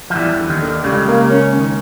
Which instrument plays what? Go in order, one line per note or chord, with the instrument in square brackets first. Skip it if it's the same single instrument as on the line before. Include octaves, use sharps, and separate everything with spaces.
[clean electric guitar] F3
[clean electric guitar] E2 E3 [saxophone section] G3
[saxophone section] D3
[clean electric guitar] D#2 D#3
[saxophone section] D3
[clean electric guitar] C#2 C#3 [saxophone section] G3
[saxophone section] A#3
C#4
D#3